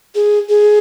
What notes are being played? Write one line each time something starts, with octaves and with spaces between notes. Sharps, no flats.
G#4
G#4